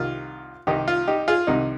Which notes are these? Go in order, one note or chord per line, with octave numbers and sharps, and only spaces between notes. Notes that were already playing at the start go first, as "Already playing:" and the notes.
Already playing: C2 C3 D#3 F4
C2 C3 D#3 D#4 G4
F4
D#4 G4
F4 G#4
C2 C3 D#3 D#4